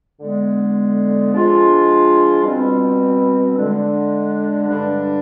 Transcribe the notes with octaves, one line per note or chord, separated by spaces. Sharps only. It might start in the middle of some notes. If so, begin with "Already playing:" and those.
D3 G#3 B3
F3 G#3 D4 F4
B2 G3 C4
D3 G#3 D4
G2 D3 G3 D4